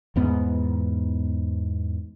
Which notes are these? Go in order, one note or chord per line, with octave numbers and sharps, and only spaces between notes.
E2 G#2 B3